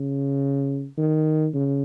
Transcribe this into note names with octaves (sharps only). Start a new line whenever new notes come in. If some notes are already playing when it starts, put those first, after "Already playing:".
Already playing: C#3
D#3
C#3